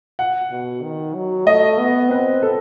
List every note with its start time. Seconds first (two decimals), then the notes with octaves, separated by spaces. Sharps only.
0.19 F#5
0.51 B2
0.83 D#3
1.15 F#3
1.47 A3 D#5
1.79 B3
2.11 C4 B4
2.43 A4